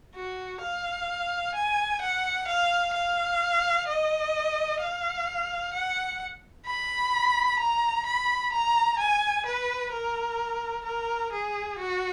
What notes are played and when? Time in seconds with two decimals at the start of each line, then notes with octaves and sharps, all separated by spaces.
0.15 F#4
0.62 F5
1.55 G#5
2.01 F#5
2.48 F5
2.94 F5
3.88 D#5
4.81 F5
5.74 F#5
6.66 B5
7.60 A#5
8.06 B5
8.53 A#5
8.99 G#5
9.46 B4
9.92 A#4
10.85 A#4
11.32 G#4
11.78 F#4